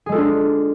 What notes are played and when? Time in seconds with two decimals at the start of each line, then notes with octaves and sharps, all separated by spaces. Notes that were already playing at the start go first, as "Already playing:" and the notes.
0.06 G#4
0.09 G#3
0.12 A4
0.15 F4
0.17 D4